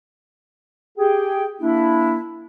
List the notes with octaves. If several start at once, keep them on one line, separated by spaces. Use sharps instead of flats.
G4 G#4 G5
A#3 D4 E4